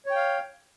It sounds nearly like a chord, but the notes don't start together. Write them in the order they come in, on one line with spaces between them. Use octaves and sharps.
C#5 G5 F5